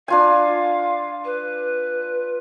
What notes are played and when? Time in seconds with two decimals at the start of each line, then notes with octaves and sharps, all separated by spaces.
0.08 D4 F4 F5 G#5
1.25 B4